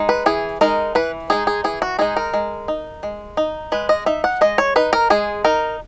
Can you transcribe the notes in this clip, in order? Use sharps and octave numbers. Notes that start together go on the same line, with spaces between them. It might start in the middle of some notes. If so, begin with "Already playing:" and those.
Already playing: G#3 D#4
B4
E3 G#4
G#3 D#4 A#4
E3 B4
G#3 D#4 G#4
G#4
E3 G#4
F#4
G#3 D#4 G#4
A#4
G#3
D#4
G#3
D#4
G#3 B4
D#5
D#4 E5
F#5
G#3 D#5
C#5
D#4 B4
A#4
G#3 G#4
D#4 A#4